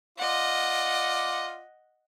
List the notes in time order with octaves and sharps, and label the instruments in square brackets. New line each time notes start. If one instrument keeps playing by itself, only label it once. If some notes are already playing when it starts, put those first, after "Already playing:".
[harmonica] F4 D5 [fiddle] D#5 F#5